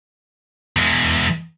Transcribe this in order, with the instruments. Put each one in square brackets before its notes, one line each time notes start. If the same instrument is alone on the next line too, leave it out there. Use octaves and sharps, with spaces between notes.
[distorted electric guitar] E2 G#3